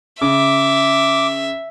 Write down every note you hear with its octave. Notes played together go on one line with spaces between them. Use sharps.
C#3 E5 D6